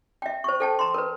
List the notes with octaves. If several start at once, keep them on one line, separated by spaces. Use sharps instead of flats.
E5 G5
C5 C#6
A4 G5 A5
A#5 C6
A#4 B4